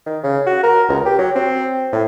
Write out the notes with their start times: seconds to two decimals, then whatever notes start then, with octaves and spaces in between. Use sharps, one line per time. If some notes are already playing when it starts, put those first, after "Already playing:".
0.06 D#3
0.24 C#3
0.47 F#4
0.63 A#4
0.89 C#2
1.06 G4
1.19 F#3
1.35 C4
1.93 A2